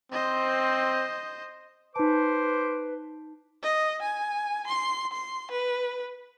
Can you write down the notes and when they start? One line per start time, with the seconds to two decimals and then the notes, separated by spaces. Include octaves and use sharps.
0.12 C4 C5 D#5
1.96 D#4 B4 C5 A5 D6
3.63 D#5
4.02 G#5
4.67 C6
5.13 C6
5.51 B4